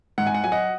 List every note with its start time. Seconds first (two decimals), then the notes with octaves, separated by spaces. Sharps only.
0.18 G#2 F#5
0.27 G#5
0.34 F#5
0.44 F#3 G#5
0.52 D#5 F#5